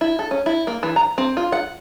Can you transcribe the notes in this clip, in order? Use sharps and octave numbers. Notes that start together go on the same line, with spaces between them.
E4
A4
C#4
E4
A#3
E3
A#5
C4
F4
F#5